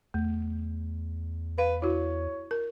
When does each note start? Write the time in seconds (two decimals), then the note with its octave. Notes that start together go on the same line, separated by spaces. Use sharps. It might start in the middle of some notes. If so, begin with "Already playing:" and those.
0.14 E2 A3
1.58 B4 F5
1.82 E4 F#4 C#5
2.51 A#4